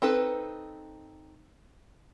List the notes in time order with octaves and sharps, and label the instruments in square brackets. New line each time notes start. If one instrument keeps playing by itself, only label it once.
[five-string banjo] C4 D#4 A4 B4